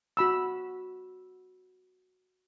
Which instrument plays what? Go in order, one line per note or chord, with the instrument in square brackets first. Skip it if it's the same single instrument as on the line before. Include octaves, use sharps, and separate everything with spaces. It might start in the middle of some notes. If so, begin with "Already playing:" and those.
[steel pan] F#4 B5 E6